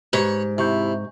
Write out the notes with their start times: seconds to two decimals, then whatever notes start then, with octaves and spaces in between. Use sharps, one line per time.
0.13 G#2 G4 B4 C#5
0.58 C3 E4 E5 C#6 G6